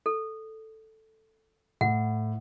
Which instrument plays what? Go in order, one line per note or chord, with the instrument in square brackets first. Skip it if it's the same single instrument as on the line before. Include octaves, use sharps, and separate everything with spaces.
[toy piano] A4
[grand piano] A2 [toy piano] F#5